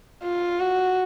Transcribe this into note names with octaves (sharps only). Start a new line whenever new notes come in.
F4
F#4